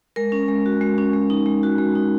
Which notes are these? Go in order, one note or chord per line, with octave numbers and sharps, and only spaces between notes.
G#3 A#4
C#4
G#3
F#4
G#3
C#4
G#3
D#4
G#3
F#4
G#3
D#4